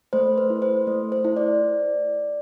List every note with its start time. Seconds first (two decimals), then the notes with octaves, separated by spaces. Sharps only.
0.13 A3 C5
0.38 B4
0.50 E4
0.62 C5
0.87 A3
1.12 C5
1.25 E4
1.37 D5